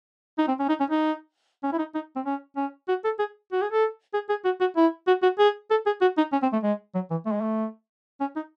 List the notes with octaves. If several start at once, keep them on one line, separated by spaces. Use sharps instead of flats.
D#4
C4
C#4
D#4
C#4
D#4
C#4
E4
D#4
D#4
C4
C#4
C#4
F#4
A4
G#4
F#4
G#4
A4
G#4
G#4
F#4
F#4
E4
F#4
F#4
G#4
A4
G#4
F#4
D#4
C#4
C4
A3
G#3
F#3
E3
A3
G#3
A3
C#4
D#4